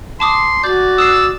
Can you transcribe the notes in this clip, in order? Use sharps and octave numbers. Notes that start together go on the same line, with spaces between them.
A5 C6 D6 D#6
F#4 D5 G6 A6
D#6 E6 F#6 C7